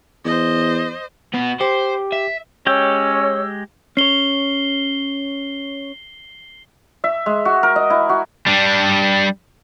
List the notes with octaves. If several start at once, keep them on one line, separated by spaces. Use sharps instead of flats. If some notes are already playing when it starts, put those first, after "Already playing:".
E2 C5 D#5
B2 B3
G4 C5
E5
G#3 C#4 G4 C#5 G5 E6
C#4 C#5 C7 G7
E5
G#3
F#4
A#4
D#5
E4
F#4
G3 D4